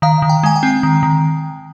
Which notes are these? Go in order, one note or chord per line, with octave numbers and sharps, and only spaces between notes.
D#3 F5
D#3
G5
G#3 G#5
G5
C4
D#3
D#3